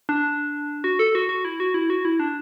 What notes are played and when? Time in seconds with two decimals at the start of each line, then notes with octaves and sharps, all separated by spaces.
0.09 D4
0.84 F#4
0.99 A4
1.15 F#4
1.29 F#4
1.45 E4
1.60 F#4
1.74 E4
1.90 F#4
2.05 E4
2.20 D4